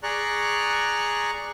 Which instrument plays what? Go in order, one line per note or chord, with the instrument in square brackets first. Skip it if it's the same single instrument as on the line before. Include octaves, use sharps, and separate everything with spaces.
[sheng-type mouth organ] G#4 D5 A#5 C#6 F#6